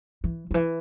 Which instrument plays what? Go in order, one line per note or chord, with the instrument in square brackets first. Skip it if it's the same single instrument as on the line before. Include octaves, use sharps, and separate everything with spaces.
[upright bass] E3
D3
E3